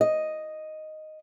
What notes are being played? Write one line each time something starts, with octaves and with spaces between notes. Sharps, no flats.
D#5